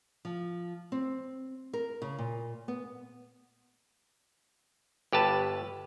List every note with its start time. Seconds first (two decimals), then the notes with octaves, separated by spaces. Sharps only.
0.25 F3
0.92 C4
1.73 A#4
2.02 C#3
2.18 A#2
2.68 B3
5.12 G1 G4 B4 A5